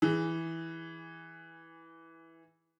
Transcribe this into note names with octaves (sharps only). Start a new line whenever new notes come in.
E3 G#4